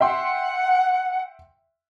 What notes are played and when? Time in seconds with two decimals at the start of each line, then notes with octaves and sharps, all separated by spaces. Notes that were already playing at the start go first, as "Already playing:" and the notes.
0.01 E5 F#5 G5 C6